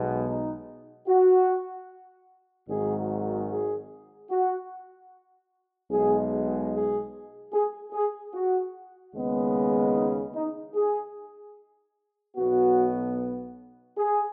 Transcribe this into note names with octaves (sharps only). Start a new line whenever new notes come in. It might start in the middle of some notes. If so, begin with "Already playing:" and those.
Already playing: B1 B2 G#3 B3
D#4
F#4
G#1 G#2 D#3 F#3 G#4
G#4
F#4
B1 B2 G#3 G#4
G#4
G#4
G#4
F#4
D#2 C#3 G#3 B3
D#4
D#4
G#4
B1 B2 B3 F#4
G#4